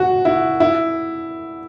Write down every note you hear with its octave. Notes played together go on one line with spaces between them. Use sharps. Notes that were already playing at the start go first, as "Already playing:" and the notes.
Already playing: F#4
E4
E4